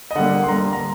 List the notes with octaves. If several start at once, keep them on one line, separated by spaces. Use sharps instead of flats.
D#5
D3 G3 A#3 F#5
C6
D3 G3 A#3 A#5
A#5